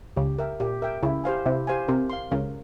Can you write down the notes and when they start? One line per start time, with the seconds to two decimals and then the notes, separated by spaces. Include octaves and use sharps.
0.16 C#2 C#3 G4
0.39 A#4 E5 G5
0.60 A#2 G4
0.82 A#4 E5 G5
1.03 C#2 C#3 E4
1.24 G4 C5 F5 G#5
1.46 C3 E4
1.67 G4 C5 F5 G#5
1.88 C3 A#4
2.10 F5 C6
2.31 C#2 C#3 A#4